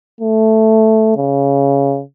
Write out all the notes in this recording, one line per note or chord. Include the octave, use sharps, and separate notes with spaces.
A3
C#3